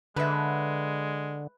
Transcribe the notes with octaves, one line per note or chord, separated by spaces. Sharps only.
D3 G#3 B4 E5